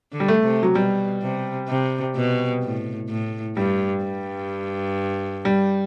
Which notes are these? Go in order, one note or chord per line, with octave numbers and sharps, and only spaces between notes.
D3
G3
A3
C3
F#3
B2 G3
C3
C3
B2
A2
A2
G2 G3
G2
G3